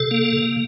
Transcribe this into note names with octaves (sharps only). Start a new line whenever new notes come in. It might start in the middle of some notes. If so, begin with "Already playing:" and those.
Already playing: C3 A4
A#3
C3